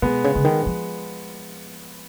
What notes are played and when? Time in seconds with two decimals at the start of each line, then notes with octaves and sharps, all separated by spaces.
0.02 B2 G#3 B3
0.24 C#3
0.35 C#3 G#3
0.45 D#3
0.67 F3